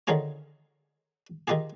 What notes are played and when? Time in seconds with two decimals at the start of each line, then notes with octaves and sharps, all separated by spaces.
0.07 D3 D#3 D#4 F4 G#4 C#5
1.48 D#3 D#4 F4 G4 G#4